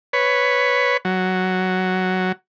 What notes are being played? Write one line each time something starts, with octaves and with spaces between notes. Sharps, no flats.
B4 C#5
F#3